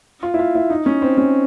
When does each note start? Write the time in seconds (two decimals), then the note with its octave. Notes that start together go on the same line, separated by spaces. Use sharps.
0.23 F4
0.34 E4
0.39 F4
0.55 E4
0.70 D#4
0.86 C#4
1.02 C4
1.17 C#4